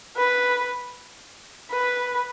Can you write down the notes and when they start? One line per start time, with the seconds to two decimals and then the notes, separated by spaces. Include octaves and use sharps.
0.17 B4
1.71 B4